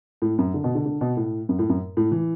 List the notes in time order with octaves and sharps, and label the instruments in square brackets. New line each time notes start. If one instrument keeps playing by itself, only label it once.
[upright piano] A2
F#2
D3
B2
D3
D3
B2
A2
F#2
A2
F#2
A2
E3